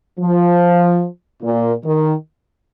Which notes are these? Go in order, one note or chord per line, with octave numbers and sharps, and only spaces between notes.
F3
A#2
D#3